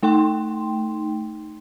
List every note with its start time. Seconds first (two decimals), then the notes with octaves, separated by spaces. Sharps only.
0.03 A3 D#4 G5 C6